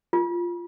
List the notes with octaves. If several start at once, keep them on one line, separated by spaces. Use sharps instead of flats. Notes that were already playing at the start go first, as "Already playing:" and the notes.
F4